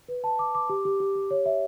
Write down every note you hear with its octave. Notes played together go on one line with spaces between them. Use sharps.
B4
A5
D6
D6
G4
G4
G4
G4
C#5
E5